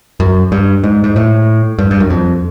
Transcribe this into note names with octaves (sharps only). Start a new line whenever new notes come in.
F#2
G2
G#2
G#2
A2
G2
G2
F#2
F2